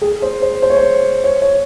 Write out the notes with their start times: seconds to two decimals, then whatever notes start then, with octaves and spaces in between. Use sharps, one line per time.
0.02 G#4
0.22 C5
0.42 C5
0.62 C5
0.70 C#5
0.77 C5
1.24 C#5
1.42 C#5